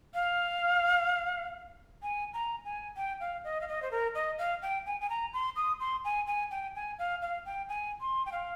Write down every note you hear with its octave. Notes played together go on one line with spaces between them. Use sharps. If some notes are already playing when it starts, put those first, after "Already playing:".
F5
G#5
A#5
G#5
G5
F5
D#5
F5
D#5
C5
A#4
D#5
F5
G5
G#5
G#5
A#5
C6
D#6
C6
G#5
G#5
G5
G#5
F5
F5
G5
G#5
C6
G5
F5